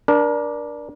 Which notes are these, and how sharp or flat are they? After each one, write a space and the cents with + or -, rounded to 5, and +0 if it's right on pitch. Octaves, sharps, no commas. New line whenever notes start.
D4 +0 A#4 +30